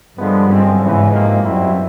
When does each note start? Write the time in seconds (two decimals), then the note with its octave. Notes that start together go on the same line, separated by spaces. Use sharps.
0.18 G2 D3 F3 G#3 B3
0.49 F#2 D3 F3 G#3 C4
0.80 E2 G#2 C#3 E3
1.12 F2 C3 F3 A#3 D#4
1.43 F#2 B2 G3 C4 E4